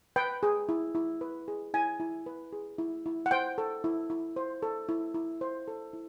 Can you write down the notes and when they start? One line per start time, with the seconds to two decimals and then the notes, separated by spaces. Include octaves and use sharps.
0.16 B4 G5
0.43 G#4
0.69 E4
0.95 E4
1.21 B4
1.48 G#4
1.74 E4 G#5
2.00 E4
2.26 B4
2.53 G#4
2.78 E4
3.06 E4
3.26 F#5
3.31 C5 G5
3.58 A4
3.84 E4
4.10 E4
4.36 C5
4.63 A4
4.89 E4
5.14 E4
5.41 C5
5.68 A4
5.93 E4